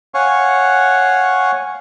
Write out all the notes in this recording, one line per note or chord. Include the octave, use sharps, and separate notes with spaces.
C#5 F5 F#5 G#5 C#6